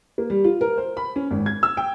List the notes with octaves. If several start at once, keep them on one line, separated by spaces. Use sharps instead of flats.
A#3
G3
F4
A#4
C5
B5
C#4
G#1
G#6
E6
G5